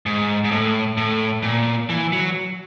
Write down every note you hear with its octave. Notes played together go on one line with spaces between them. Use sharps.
G#2
G#2
A2
A2
A#2
E3
F#3